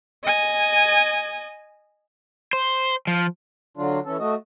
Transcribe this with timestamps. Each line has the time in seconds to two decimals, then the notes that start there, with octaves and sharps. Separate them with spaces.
0.24 D#5 G#5
2.53 C5
3.07 F3
3.77 D3 F#3 D4 F4
4.05 E3 C#4 A4
4.20 A3 F#4 D#5